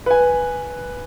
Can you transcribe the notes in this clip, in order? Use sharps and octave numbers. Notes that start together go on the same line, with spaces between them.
B4 G#5